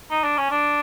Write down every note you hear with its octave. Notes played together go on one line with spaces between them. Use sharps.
D#4
D4
C#4
D4